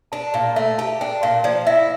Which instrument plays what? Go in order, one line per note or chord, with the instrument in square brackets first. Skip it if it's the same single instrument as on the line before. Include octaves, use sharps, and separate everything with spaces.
[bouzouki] D4 [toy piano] A5
[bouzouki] A#2 [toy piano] F5
[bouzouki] A3 [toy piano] E5
[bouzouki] G4 [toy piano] A5
[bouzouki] D4 [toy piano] G5
[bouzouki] A#2 [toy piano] F5
[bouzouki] F3 [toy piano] D5
[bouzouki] E4 [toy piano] E5